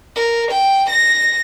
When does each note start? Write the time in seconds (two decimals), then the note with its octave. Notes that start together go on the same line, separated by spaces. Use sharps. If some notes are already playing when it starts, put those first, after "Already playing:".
0.16 A#4
0.51 G5
0.89 A#6